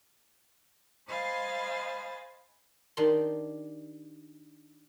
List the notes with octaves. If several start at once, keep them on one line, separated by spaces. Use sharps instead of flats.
C5 D#5 F5 G#5 B5 A6
D#3 D4 G4 C6